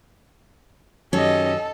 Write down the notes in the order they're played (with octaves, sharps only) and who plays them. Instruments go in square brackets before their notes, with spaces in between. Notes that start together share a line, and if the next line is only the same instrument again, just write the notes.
[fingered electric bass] F#2 D#3 F#3 [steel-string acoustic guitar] C#4 [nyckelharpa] G4 D#5 [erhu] A4